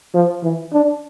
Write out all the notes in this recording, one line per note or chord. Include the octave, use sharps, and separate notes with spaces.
F3
E3
D4